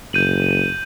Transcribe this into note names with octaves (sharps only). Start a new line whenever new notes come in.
F#1 G6 D#7 F#7